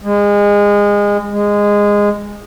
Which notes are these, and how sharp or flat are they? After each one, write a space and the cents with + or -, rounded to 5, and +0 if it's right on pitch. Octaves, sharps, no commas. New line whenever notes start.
G#3 -25
G#3 -15